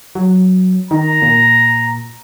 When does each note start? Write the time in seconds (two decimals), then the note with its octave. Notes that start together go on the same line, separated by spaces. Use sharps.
0.15 F#3
0.91 D#3 A#5
1.22 A#2